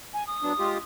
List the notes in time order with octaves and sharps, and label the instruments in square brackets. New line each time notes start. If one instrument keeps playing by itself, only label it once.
[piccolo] G#5
D#6
[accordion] F#3 B3 D4
G#3 F4 G4